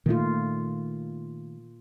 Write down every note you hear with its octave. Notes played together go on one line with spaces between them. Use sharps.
A#2 D#3 A3 F4